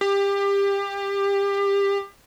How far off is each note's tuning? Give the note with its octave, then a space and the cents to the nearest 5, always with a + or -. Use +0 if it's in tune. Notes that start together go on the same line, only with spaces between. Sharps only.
G4 +25